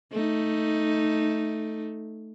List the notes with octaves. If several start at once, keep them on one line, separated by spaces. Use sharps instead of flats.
A3 D#4